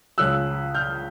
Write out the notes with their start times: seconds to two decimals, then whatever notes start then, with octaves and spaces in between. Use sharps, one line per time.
0.18 C#2 C#3 F3 E6 F#6
0.75 F6 G6